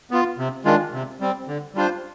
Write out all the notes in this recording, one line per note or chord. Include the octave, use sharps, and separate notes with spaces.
B3 F4
C3
D#3 G#3 D4 F4
C3
G3 C4
D3
G3 D4 F4 C5